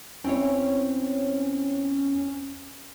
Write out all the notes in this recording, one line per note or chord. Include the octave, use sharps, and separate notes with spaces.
E2 C4 C#4 E4 C#5